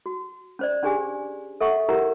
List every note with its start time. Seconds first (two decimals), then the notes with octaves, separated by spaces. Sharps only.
0.06 F#4
0.59 C#4 C5 D5
0.83 C#4 D4 G4 G#4 G#5
1.61 A4 E5 F#5 C#6
1.89 E4 G4 A#4 F#5 G5 A#5